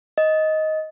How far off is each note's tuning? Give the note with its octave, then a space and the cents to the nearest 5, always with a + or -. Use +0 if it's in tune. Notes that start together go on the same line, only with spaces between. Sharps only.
D#5 +10